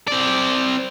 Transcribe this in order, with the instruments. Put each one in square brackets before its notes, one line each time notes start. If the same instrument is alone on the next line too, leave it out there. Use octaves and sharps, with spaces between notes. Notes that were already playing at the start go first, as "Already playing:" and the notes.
[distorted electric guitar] C4 D5